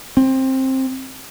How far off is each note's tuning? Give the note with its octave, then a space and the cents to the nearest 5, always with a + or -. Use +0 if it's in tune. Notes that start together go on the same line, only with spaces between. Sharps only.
C4 +15